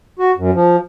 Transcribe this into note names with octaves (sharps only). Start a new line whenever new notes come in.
F#4
F#2
F3